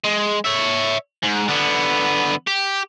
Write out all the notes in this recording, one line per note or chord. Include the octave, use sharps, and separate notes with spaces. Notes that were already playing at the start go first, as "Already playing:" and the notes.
G#3
C#5 E5
G#2
D3 B3
G4